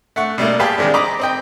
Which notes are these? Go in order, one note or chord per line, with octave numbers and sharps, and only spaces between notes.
A3 F#5 C#6
B2 G3 A3 A#3
G4 G#4 B4 F5 A5
D#3 G3 G#3 C4 D4
D#5 A#5 B5 D6
C4 D#5 G5